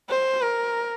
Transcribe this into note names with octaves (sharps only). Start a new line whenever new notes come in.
C5
A#4